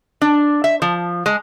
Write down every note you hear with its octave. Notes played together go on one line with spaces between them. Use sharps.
D4
E5
F3
G#3